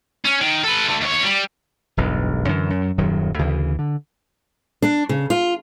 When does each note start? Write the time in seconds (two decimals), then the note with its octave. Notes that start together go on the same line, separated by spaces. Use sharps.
0.25 C#4
0.41 D#3
0.64 A4 B4
0.88 D3 A3
1.01 D#2 C#5
1.23 G3
1.97 E1 B1 G2
2.47 F#2 D3 E3
2.70 F#2
2.98 D#1 F#2 D#3 F#3
3.39 D2 C#3 E3
3.79 D3
4.82 D4
5.09 C#3
5.30 F4